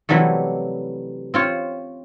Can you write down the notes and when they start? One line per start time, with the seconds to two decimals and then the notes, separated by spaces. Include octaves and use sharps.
0.09 C3 E3 F#3 G3 A3
1.34 C4 F4 C#5